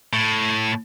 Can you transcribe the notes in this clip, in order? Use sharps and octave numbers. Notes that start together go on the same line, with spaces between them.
A2